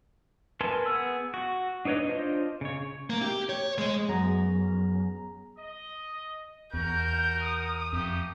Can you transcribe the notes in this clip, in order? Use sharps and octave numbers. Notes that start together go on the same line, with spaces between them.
A#4 B4 G#5 A5 C6
B3 G#4 E6
F#4
D4 D#4 B4 C#5 D#5
D4 F4 C5 D#5
C#3 C#5
A#3
G4
C#5
G#3
F#2 B3 G#4 A#5
D#5
E2 F#4 A#4 G6
D#6
F2 A3 A#3 G4